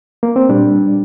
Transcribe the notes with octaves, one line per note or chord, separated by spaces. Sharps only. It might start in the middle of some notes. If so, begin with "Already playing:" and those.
A#3
C4
A#2 G3 D4